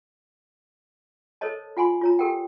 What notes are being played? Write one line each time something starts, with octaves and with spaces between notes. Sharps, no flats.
A4 A#4 C5 C#5 D#5 A5
F4 F#5 G#5 B5 C6
F4 C#5 A#5
G4 A4 A#4 F#5 G5